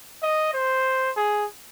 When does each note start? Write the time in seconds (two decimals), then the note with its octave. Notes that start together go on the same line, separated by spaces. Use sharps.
0.23 D#5
0.54 C5
1.17 G#4